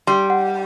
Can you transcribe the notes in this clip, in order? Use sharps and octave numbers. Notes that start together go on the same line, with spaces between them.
G3 C6
F#5